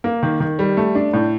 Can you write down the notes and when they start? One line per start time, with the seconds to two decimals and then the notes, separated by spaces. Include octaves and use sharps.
0.04 A#3
0.23 D#3
0.40 D#3
0.59 G3
0.77 A3
0.95 D4
1.13 A2